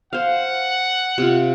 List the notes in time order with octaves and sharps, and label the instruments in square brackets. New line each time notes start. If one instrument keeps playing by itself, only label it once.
[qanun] C5 F5 [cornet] F#5
[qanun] C3 F4